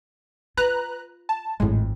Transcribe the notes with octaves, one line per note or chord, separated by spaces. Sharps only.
F4 B4 A#5 F#6
A5
G#1 F2 A2 G#3